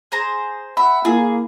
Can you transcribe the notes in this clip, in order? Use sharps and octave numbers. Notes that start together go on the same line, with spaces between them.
G#4 C5 A#5
E5 F#5 B5
A#3 E4 G#4